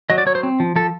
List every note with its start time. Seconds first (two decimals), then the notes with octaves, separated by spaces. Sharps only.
0.10 F#3 D#5
0.18 D5
0.26 F#3 C#5
0.35 C5
0.43 C4
0.60 F3
0.76 F3 A4